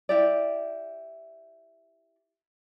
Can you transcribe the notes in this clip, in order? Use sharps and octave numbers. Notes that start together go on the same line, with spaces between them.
E4 G4 D5